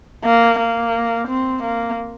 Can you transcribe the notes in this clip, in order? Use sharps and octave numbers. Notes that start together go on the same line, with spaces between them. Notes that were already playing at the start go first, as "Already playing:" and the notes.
A#3
A#3
C4
A#3